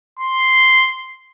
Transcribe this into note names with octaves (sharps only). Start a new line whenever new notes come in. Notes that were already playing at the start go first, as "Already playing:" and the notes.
C6